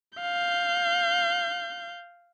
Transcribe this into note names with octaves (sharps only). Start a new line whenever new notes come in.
F5 G6